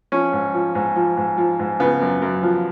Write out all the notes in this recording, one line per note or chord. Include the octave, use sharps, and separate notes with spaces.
F3 C#4
G#2
F3
G#2
F3
G#2
F3
G#2
C#3 B3
F#2
F#2
F3